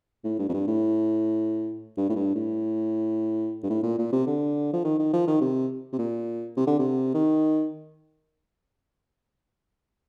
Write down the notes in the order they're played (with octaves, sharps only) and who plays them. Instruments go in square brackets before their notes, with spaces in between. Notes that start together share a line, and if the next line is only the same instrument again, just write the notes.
[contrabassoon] A2
G2
F2
G2
A2
G2
A2
G2
A2
G2
A2
A#2
A#2
C3
D3
F3
D#3
D#3
F3
D#3
C3
C3
A#2
C3
D3
C3
D#3